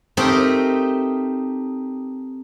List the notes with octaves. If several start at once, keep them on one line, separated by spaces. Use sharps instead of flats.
A3 C4 D#4 G4 A#4 C5